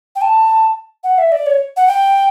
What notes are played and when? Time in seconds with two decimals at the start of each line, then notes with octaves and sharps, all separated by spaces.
0.16 G5
0.22 A5
1.04 F#5
1.18 E5
1.32 D5
1.46 C#5
1.77 F#5
1.87 G5